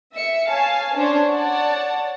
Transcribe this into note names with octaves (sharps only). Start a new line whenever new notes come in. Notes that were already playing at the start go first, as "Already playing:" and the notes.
E5 C#7
C#5 F5 G#5 A5
C#4 D4 C5 C#5
C#5 D5 F#5 A5